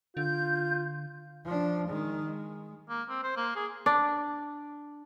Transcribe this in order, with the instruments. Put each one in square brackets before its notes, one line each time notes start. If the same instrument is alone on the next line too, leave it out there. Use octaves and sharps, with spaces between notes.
[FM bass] D3 [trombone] F4 [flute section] G6
[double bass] F3 D4
D#3 G#3
G#3
[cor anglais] A#3
C4
C5
A#3
G#4
[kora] D4